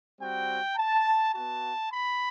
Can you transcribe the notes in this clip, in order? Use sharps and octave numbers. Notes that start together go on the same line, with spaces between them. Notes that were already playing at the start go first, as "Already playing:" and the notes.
G3 C4 F#4 G5
A5
B3 F#4 A5
B5